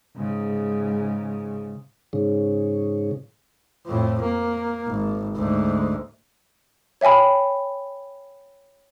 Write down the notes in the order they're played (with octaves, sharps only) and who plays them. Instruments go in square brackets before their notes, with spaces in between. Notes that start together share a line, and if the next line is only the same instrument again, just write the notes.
[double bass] G#2 C#3
[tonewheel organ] G#2 C#3
[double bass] F2 A2
A#3
G#1
D2 G#2
[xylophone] C#5 E5 G5 G#5 B5